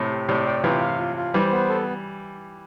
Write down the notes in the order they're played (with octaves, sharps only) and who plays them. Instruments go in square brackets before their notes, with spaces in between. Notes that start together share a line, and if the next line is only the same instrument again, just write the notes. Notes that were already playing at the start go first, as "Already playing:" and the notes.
Already playing: [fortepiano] A2 C3
[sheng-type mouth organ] G4
[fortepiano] A2 C3 [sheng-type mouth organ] D5
[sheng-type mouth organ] G5
[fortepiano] C3 E3 [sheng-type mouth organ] F4
[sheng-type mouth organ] F5
F4
F4
[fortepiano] E3 G3 [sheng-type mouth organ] C5
[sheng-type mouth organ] B3
A4